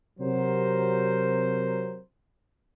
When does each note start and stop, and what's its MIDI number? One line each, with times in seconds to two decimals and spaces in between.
0.19 1.99 48
0.19 1.99 54
0.19 1.99 70
0.19 1.99 72